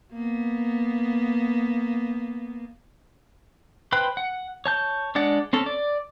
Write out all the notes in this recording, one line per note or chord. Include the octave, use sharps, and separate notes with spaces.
A#3 B3
B4 C5 G5 B5 F#6
F#5
C#5 A5 G6
G#3 D4 D5 F#5
C4 C#4 A4
D5